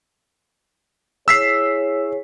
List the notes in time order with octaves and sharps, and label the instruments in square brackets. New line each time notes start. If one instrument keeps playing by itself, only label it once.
[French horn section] E4 G#4 C#5 [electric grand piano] E6 B6 C7